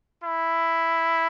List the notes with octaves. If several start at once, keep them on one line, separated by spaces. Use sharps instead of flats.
E4